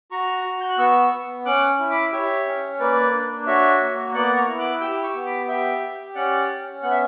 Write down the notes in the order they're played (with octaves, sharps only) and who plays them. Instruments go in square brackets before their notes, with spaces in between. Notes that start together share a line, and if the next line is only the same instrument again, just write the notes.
[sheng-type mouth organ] F#4 A#5 C#6
F#4
G6
F#6
B3 C#6 E6
B3
C#4 D6 F#6
E4
B5 D6
G4 C#5 E5
C#4
A#3 B4 D5
D4
F#4 C#5 E5
A#3
B3 D5 F#5
A#5 C#6
E4
D6 F#6
G4 E6 G6
C#6 E6
B3
B5 D6
G4 E5 G5
G4
C#4 D5 F#5
C#4
B3 F#5
E5